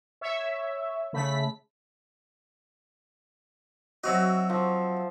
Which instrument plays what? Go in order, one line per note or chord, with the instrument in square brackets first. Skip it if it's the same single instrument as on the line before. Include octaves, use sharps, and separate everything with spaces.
[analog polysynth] C#5 E5
C#3 A3 B5 B6
[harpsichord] F#3 C4 D#5 [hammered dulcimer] F#4 E5
[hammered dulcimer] F3